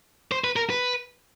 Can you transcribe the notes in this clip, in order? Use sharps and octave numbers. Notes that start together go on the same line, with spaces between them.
C5
B4
A#4
B4